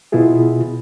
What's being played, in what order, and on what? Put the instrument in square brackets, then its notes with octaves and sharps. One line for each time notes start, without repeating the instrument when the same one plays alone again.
[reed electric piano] B2 B3 E4 F4 G#4